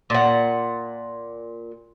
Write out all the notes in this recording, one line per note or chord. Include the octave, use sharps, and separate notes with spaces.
A#2 F#5